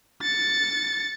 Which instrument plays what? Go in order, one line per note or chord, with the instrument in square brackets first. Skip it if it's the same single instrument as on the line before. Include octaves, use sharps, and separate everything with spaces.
[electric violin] A6 C#7